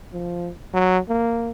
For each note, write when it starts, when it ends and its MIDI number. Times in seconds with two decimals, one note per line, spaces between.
0.13 0.50 53
0.74 0.98 54
1.09 1.51 58